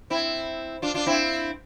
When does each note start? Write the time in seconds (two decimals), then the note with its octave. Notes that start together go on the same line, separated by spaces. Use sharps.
0.10 C4 E4
0.82 D4 F4
0.94 D4 F4
1.06 C4 E4